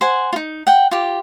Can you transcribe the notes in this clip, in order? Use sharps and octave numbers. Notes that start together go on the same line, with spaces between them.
C5 F#5 G#5
D#4 F4
F#5 G5
F4 G4